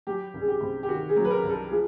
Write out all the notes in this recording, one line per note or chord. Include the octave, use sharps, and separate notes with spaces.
F#3 G4
C2
G#4
G4
C3
G4
D#3 F#4
G#4
F#3
B4
A#4
C2
A4
F3 G#4